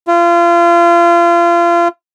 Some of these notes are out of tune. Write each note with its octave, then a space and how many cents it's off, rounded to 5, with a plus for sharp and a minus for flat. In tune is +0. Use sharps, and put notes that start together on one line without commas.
F4 -30